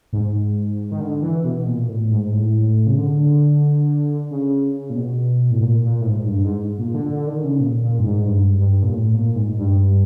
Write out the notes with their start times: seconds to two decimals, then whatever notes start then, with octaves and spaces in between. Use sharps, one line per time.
0.13 G#2
0.92 D#3
1.00 D3
1.22 E3
1.44 B2
1.67 A#2
1.88 A2
2.11 G#2
2.32 A2
2.87 C#3
2.98 D3
4.31 C#3
4.90 A#2
4.96 B2
5.51 A2
5.63 A#2
5.84 A#2
6.01 A2
6.07 G#2
6.28 G2
6.45 G#2
6.78 A#2
6.94 D3
7.10 D3
7.27 D#3
7.44 C#3
7.60 A#2
7.83 A#2
7.99 G2
8.04 G#2
8.27 G2
8.59 G2
8.83 A#2
8.93 A2
9.14 A#2
9.36 G#2
9.59 G2